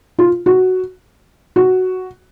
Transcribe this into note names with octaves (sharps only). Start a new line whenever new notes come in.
F4
F#4
F#4